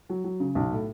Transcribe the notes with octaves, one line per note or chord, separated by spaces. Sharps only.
F#3
F#3
C#3
B1
A2